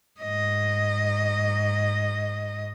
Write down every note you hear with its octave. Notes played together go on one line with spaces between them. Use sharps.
G#2 D#5